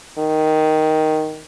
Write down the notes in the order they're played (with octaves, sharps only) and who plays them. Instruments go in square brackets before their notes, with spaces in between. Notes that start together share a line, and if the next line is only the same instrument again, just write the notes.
[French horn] D#3